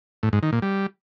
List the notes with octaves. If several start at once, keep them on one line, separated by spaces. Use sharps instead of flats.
A2
G#2
D#3
A#2
G3